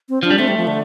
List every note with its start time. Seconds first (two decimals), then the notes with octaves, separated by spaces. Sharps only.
0.09 C4
0.23 F3 D4
0.30 G3
0.39 A3 C4
0.48 G3
0.57 F3
0.67 D3